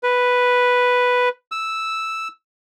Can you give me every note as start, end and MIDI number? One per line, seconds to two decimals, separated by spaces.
0.03 1.29 71
1.52 2.28 88